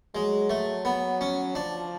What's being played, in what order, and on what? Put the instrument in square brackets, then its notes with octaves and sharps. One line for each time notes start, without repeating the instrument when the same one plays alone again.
[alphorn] F#3 [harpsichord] G#3
[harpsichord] A3
B3
C#4
[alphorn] F3 [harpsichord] D4